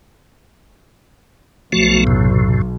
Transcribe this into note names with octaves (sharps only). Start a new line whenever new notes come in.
B1 F3 A3 F#4
F#2 A2 C3